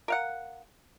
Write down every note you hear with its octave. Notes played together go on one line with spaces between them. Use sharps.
A#4 F5 F#5